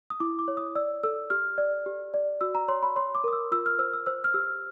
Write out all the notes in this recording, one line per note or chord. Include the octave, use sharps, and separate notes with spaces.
D#6
E4 D6
D6
C#5
D#6
D5 E6
A4 E6
G4 F6
D5
G4
D5
F#4 E6
A#5
C#5 C6
B5
C#5 C6
D6
A#4 D#6
E6
F4 E6
F6
C5 E6
E6
C5 E6
F6
G4 E6